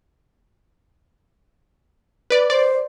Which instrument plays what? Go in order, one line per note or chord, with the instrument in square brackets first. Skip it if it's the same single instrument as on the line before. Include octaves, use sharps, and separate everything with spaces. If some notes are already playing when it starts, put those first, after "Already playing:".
[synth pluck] B4 D5
[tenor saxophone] C5 [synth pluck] D5